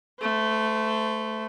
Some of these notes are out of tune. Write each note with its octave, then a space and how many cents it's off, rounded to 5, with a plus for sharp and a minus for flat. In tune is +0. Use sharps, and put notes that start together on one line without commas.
A3 +0 C5 -35